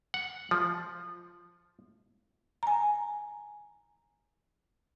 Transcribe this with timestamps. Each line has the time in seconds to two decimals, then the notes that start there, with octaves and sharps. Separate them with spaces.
0.14 F#5
0.51 F3
2.63 G#5 A#5